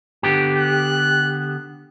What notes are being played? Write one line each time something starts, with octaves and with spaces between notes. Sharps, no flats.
D3 B3 G4
F#6